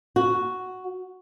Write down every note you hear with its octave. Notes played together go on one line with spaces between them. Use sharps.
F#4